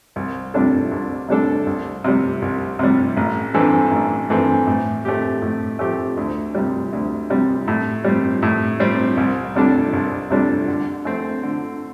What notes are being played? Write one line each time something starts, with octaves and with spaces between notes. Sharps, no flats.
C2
C3 G3 D4 A4
C2
C3 G3 D4 A4
C2
C3 G3
C2
C3 G3
A1
G2 E3 C4 A4
A1
G2 E3 C4 A4
A2
A3 C4 G4
A2
A3 C4 G4
D2
C3 G3
D2
C3 G3
A2
G3 C4
A2
G3 C4
C2
C3 G3 D4 A4
C2
C3 G3 D4 A4
D3
A3 C4
D3